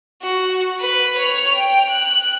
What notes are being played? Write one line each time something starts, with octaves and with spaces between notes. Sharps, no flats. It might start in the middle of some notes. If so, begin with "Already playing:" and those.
F#4
B4
C#5 F7
G5
F#6